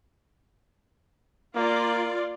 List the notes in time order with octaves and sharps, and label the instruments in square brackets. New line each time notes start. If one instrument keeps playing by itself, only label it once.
[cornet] A#3 [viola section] F4 D5